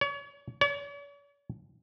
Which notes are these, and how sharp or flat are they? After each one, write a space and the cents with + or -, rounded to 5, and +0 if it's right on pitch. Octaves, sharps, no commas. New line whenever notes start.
C#5 +35
C#5 +45